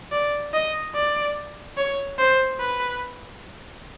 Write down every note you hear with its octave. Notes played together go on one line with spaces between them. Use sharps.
D5
D#5
D5
C#5
C5
B4